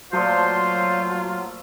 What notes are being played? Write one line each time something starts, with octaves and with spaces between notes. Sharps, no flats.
A#2 F3 F#3 A3 F4 C5